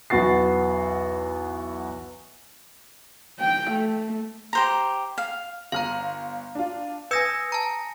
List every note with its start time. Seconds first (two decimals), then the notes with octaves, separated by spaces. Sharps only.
0.10 B1 E2 B3 F#4 A6 C7
3.40 G5
3.71 A3
4.53 G4 C5 A#5
5.18 F5
5.72 G1 F5 A#5 F6
6.55 D4 F4
7.11 B4 G#5 D#6 E6 G6 G#6 A#6 C#7
7.52 A5 A#5